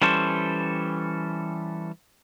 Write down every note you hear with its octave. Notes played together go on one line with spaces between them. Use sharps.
E3 G3 C#4 A4 C5